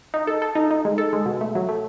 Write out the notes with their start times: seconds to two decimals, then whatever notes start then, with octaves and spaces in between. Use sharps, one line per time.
0.14 D#4
0.27 A4
0.42 A4
0.55 D#4
0.71 D#4
0.85 G#3
0.98 A4
1.13 G#3
1.26 B2
1.41 A3
1.55 F#3
1.69 A3